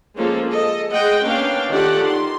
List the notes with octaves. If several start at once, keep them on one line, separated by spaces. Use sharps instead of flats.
F3 G#3 A#3 C#4 A4
G#4 A4 D#5
G#3 D#5 F#5 G5
A#3 B3 C#4 D4 F5 G5
D#3 F4 G4 A4 D5 F#5
D#3 C6